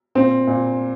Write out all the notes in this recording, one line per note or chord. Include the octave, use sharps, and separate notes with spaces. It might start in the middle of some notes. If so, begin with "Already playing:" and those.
A#2 C4
A#2